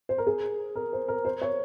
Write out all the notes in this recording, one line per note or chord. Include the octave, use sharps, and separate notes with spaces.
C5
A#4
G#4
A#4
C5
A#4
C5
C#5